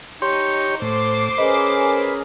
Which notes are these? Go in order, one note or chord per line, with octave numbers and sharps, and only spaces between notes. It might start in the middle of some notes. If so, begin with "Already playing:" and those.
D#4 G4 C#5 C6
A2 C5 D6 C7
C#4 G#4 A#4 B4 D#5